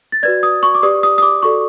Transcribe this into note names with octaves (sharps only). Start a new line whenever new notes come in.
A6
F#4 B4 D5 G#6
D#6
C#6
D6
G4 B4 D5 D#6
D#6
D#6
D6
F#4 A4 D5 C#6